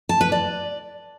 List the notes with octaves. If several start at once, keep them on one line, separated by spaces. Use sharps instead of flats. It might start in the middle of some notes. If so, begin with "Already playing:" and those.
A5
B4
D5